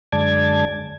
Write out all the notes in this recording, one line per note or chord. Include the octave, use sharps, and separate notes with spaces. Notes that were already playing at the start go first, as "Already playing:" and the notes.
F#2 D3 G#3 D5 A5 G#6